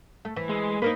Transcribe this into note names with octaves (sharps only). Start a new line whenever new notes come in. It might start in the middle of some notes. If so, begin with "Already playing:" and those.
A3
E3
G#3
A#3 D#4 A#4 B4